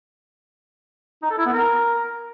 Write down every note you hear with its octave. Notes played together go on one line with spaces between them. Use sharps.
D#4
A4
E4
B3
A#4